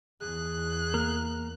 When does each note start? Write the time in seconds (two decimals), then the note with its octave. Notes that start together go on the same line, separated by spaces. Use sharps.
0.21 E2 G#4 F#6
0.94 A#3 A#4